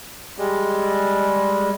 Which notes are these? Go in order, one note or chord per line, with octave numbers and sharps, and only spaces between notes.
G3 G#3